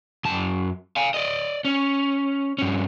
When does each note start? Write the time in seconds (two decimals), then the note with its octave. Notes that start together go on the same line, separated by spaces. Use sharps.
0.25 F#2 A5
0.96 F5 G#5
1.14 D5 D#5
1.65 C#4
2.58 G2 C#4